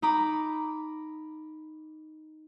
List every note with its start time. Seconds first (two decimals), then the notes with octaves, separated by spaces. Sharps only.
0.02 D#4 A#5 B5 D6